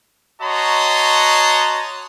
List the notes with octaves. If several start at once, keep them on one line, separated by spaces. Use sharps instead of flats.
F#4 C#5 D#5 A5 A#5 C6